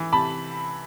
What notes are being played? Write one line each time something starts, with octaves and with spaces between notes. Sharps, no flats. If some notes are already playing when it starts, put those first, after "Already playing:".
Already playing: E3
C3 A5 B5